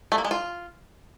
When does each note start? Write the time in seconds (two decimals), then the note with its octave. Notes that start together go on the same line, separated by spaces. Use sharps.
0.12 A3
0.18 A#3
0.24 G#3
0.31 F4